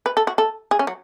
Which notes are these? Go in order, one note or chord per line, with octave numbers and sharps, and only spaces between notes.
B4
A4
F#4
A4
G#4
C#4
F#3